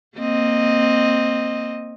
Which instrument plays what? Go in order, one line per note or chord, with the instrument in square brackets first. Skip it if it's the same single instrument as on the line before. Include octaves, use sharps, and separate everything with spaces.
[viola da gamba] A#3 C4 D#5